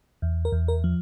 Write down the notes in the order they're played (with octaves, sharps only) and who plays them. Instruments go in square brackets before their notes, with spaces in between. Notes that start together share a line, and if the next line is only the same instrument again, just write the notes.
[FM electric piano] E2
A#4
E2
A#4
F3